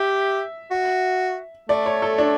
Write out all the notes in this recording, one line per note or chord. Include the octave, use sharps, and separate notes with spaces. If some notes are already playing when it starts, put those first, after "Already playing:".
Already playing: G4 E5
F#4
A3 D5
C#5
A4
D4